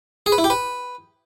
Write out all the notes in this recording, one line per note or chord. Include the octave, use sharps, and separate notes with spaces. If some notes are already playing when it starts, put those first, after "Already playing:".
G#4
B4
E4
G4
B4